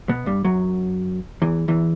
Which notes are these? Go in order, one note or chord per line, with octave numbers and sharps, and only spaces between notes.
B2 B3
G2 G3
F#2 F#3
E2 E3
E2 E3